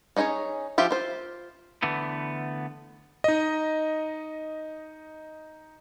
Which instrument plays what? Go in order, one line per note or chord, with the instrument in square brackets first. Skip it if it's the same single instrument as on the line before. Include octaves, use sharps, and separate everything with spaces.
[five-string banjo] C#4 D#4 G#4 C5 C#5
F3 F4 G4 E5
F4 C5
[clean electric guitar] D3 E3 A3 B3
[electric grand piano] D#4 D#5